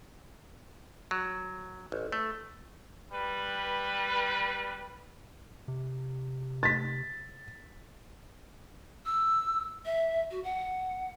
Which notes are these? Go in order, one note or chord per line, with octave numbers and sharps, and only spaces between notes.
F#3
A1
A3
G3 B4
C3
A6 B6
E6
E5
F#4
F#5